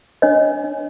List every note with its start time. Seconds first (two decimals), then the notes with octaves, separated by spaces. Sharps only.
0.22 D4 C#5 D#5
0.64 D4